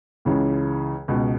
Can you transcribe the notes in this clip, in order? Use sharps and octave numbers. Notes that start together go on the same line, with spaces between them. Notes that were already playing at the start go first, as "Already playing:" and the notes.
C#2 C#3 E3
C#2 B2